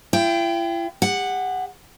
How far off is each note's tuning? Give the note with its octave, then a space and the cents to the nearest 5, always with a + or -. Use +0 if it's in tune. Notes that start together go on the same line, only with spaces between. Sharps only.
E4 +45 G5 +0
G4 +40 F#5 +0